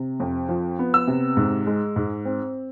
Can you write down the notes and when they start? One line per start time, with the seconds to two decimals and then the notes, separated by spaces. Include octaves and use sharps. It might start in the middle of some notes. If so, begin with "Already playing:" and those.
Already playing: C3
0.20 F2
0.49 F3
0.79 B3
0.94 E6
1.07 C3
1.37 G#2
1.67 G#3
1.96 G#2
2.25 C4